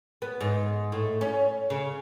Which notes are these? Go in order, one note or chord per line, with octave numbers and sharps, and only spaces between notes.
B3
G#2
A2
C#4
C#3